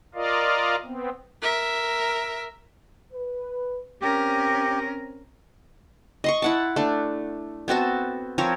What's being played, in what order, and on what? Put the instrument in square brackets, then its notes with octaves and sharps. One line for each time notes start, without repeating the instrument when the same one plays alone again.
[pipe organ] F4 A#4 D5 D#5 F5
B3 C4
[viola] A#4 E5
[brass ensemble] B4
[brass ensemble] C4 [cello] C#4 A#4 [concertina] G4
[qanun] D#5 C6 C#6
E4 F#5 A5
A3 D4
B3 C4 F#4 A5
F3 C4 A#4 C#5